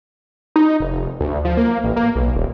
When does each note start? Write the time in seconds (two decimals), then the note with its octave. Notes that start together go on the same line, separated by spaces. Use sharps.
0.56 D#4
0.80 F1
1.20 D2
1.45 F3
1.57 A#3
1.84 A1
1.96 A#3
2.15 B1
2.35 D#1